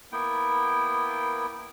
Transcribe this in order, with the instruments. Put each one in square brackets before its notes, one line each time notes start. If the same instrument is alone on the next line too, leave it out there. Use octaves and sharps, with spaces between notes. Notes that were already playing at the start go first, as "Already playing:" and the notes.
[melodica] A#3 B3 E4 G5